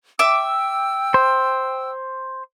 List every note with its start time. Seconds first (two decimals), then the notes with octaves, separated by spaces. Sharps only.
0.19 E5 G5 D6 E6
1.14 C5